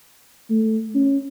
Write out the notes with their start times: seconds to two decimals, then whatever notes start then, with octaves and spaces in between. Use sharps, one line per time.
0.50 A3
0.95 C#4